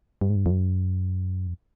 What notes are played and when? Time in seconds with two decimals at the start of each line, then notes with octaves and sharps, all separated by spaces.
0.21 G2
0.30 G#2
0.36 G2
0.46 F2
0.51 F#2
1.47 F2